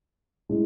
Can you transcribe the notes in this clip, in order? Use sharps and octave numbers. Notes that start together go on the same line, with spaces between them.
A2 G#3 C#4